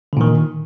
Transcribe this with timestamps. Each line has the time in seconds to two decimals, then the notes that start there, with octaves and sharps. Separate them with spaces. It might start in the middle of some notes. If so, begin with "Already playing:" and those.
0.13 D3
0.17 A#2
0.21 D#3